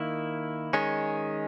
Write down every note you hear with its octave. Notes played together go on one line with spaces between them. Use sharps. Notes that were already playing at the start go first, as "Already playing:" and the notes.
Already playing: D#3 A#3 E4
D#3 G#3 C#4